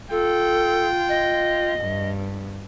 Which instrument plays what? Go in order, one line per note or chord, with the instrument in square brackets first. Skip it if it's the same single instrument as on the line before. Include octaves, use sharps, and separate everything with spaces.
[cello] F4 [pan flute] A4 [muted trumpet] G5
[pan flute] D#5
[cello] G2